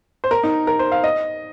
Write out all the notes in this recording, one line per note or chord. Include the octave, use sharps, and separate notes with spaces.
C5
A#4
D#4
A#4
C5
F5
D#5